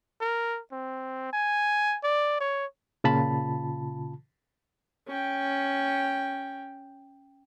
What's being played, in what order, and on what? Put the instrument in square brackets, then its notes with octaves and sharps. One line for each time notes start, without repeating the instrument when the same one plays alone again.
[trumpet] A#4
C4
G#5
D5
C#5
[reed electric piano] A#2 C#3 F4 A5 B5
[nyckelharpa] C#4 G5